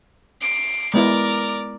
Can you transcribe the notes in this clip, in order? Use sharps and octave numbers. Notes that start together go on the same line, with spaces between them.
C7 D7
G#3 B3 E4 A#4 D5